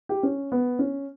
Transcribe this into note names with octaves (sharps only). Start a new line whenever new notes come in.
G4
C#4
B3
C#4